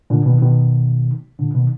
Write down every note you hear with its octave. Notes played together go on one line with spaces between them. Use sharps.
A#2 D3
B2 D#3
B2 D#3
A#2 D3
B2 D#3